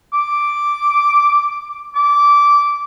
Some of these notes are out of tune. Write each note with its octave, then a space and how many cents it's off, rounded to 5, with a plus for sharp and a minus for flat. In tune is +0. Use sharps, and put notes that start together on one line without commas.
D6 +0
D6 -15